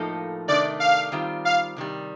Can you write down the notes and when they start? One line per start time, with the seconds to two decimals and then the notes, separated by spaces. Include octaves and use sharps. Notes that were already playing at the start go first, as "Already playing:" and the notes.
Already playing: A2 F3 A#3 D#4 A4
0.48 C3 D#3 A3 D4 D5
0.80 F5
1.12 D#3 G3 C4 F4
1.45 F5
1.76 C3 D#3 G3